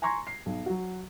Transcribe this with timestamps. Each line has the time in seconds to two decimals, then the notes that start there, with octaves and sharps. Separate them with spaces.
0.02 G#5 A#5 C6 C#6 G#6 A#6
0.27 C7
0.46 B1
0.66 F#3 F#4